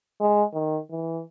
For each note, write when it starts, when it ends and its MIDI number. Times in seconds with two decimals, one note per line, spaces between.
0.20 0.43 56
0.54 0.78 51
0.91 1.22 52